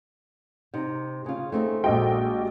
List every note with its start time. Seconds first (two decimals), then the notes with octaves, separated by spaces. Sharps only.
0.74 C3 D#4
1.26 C#3 F4 G#4
1.52 A3 C4 D#4
1.84 A#1 G#3 F#4 G4 D#5 G5